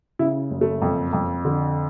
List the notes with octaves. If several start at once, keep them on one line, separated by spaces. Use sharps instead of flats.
C#3 E4
F#1
A3
F2
F2
D3